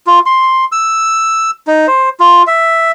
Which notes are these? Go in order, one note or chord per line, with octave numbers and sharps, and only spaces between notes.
F4
C6
E6
D#4
C5
F4
E5